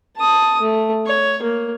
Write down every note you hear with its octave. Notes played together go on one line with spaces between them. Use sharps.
A5 D#6
A3
C#5
A#3